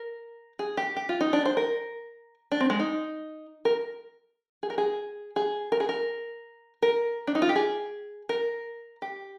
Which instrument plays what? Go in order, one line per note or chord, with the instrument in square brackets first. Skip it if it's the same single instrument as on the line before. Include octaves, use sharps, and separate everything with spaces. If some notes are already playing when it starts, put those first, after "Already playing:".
Already playing: [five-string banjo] A#4
G#4
G4
G4
F4
D#4
D4
C5
A#4
D4
C4
G#3
D#4
A#4
G#4
A#4
G#4
G#4
A#4
G#4
A#4
A#4
D4
D#4
F4
G4
G#4
A#4
G4